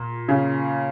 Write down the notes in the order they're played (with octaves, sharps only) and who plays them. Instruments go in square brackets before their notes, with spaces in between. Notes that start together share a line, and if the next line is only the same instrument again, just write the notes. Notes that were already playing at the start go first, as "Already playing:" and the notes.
Already playing: [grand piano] A#2 A#3
[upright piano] C#3